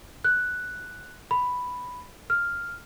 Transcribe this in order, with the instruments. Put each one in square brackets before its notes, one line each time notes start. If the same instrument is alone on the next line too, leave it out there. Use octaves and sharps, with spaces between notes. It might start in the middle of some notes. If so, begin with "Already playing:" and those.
[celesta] F#6
B5
F6